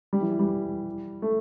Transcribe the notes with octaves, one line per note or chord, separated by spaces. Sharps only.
G3
E3
E3
G3
A3